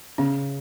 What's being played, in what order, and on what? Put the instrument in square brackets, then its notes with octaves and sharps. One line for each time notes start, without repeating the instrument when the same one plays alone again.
[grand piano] C#3 [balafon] C#4